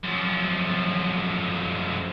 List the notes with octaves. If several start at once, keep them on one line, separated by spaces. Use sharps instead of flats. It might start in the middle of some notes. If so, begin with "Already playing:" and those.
F#2 F3